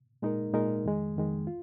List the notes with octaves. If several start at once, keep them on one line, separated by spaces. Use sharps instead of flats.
A#2 G#3 D#4 A#4
A#2 G#3 D#4 A#4
F2 D#3 G#3
F2 D#3 G#3
F4